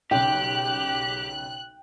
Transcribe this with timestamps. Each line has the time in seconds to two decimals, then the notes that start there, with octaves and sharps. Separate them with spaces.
0.11 B1 C#3 G4 G5 F#6